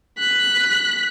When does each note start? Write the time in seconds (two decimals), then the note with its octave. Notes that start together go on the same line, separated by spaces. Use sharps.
0.19 F#6 B6